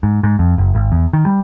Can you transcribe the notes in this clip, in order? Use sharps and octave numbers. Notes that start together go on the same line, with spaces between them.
G#2
G#2
F2
F#1
G#1
E2
D#3
G3